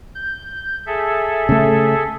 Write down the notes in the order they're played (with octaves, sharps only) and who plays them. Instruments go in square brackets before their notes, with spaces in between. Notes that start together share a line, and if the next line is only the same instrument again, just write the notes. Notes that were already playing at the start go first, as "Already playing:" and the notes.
[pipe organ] G6
G#4 A4 E5
[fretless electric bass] C#3 A3